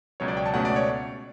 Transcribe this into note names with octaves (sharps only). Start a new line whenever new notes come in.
C#2 B2 F#3 C#5
D5
G5
A5
C#2 B2 A3 C#4 F#5
D5
C#5